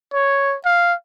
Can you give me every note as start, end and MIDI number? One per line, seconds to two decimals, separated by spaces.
0.13 0.56 73
0.65 0.94 77